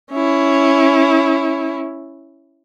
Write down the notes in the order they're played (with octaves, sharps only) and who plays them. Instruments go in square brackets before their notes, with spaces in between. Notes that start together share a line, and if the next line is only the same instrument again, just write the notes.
[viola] C#4 E4